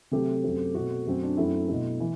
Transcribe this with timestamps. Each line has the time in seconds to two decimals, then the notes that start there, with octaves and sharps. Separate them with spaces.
0.11 C3 F#3 A3 C4 G4
0.43 F#2 F#3 A3 C4
0.74 B2 A3 C4 F#4
1.07 F#2 F#3 A3 C4
1.23 D4
1.37 F#2 F#3 A3 C4 E4
1.69 B2 F#3 A3
2.00 E3